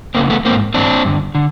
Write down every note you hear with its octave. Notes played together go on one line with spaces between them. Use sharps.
E2 C#3 E3 A#3 C4
A3 B3
G#2 E3 A#3 C4
G#2 E3 C4 D4
G2 D3
D3